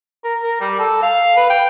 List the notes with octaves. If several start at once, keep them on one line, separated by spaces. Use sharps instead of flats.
A#4
A#4
G3
A4
F5
B4
G5